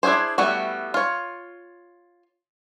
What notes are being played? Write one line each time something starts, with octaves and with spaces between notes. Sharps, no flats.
D4 E4 F#4 G#4 C5
G3 A3 B3 E4 F#4
F4 C#5